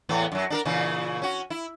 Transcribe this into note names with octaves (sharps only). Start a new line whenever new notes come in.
E2 A2 B3
F#2 F#3
D4 A4 A#4
A#2 C#3 E3
C#4 F#4
E4